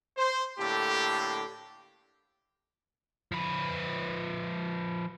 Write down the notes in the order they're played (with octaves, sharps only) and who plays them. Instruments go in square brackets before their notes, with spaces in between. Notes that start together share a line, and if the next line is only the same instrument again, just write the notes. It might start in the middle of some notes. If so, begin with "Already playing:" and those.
[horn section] C5
A2 D3 A#3 G4
[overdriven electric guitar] F3 B4